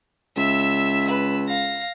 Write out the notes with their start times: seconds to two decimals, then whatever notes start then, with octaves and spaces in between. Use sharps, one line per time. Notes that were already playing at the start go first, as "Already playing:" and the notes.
0.37 C#2 E5 E6
1.08 B4 E6
1.48 F5 A#6